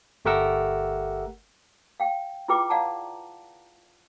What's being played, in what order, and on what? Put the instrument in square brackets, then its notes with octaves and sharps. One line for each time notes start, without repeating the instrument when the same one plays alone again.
[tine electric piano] G1 A3 G4 A#4 F#5 E6
[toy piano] F5 G5
E4 F4 G#4 B4 G5 D6
D5 F5 F#5 A5 A#5